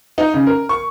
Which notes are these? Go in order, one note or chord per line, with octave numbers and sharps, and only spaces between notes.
D#4
C#3
A#4
C#6